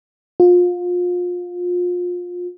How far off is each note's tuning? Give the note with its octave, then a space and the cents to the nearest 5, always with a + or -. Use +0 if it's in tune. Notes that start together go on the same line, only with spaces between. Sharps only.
F4 +30